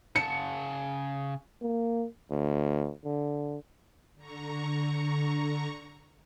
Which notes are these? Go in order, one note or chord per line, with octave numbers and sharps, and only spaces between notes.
C#3 A5 C#7
A#3
D2
D3
D3 A#5 C#6